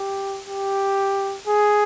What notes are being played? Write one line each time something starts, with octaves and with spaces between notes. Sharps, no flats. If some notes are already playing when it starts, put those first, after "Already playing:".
Already playing: G4
G4
G#4